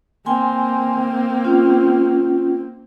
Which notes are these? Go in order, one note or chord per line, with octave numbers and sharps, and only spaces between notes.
A#3 C4 G5 G#5 C6
C#4 F4